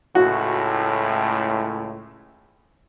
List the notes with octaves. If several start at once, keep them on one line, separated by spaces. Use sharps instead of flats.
C#2 A2 F#4